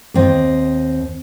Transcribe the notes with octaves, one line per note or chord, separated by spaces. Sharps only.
D#2 C4 D#5